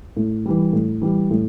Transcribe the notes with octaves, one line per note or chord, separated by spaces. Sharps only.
A2
E3 G3
A2
E3 G3
A2